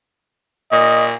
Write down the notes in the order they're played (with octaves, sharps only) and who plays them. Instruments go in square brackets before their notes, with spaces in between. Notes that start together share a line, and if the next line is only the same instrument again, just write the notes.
[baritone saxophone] A#2 [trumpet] D#5